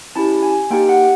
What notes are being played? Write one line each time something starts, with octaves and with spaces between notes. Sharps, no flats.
C#4 E4 G4 A5
G#5
A#3 D#4 G4 G5
F#5